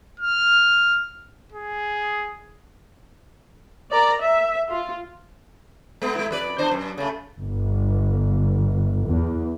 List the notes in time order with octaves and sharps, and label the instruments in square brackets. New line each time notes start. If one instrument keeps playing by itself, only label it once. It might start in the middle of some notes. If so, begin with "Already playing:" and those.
[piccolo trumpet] F6
G#4
[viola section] A#4 D5 A#5
E5
F4
[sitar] G#3 B3
G#3 E4
F2 B4 D5
E2 D4 C5
F#2
C#3 A3
[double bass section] G1
E2